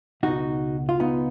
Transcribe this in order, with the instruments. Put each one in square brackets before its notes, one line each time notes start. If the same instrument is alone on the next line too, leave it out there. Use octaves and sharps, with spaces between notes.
[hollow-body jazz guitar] C#2 B2 D#4 F#4
F4
B3 D#4